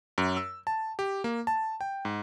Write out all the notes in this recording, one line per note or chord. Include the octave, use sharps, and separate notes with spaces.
F#2
E6
A5
G4
A#3
A5
G5
G#2